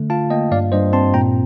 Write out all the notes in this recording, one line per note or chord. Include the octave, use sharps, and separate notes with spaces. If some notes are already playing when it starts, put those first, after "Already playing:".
Already playing: D3 A3
F4 F5 A5
A#3 D#5 G5
G2 D5 F5
G2 C5 D#5
C4 A5 C6
A#2 G5 A#5